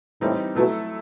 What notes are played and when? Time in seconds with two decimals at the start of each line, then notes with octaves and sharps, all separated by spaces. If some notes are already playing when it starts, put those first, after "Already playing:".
0.21 A2 E3 G3 C4 D#4
0.55 B2 F#3 A3 E4 A4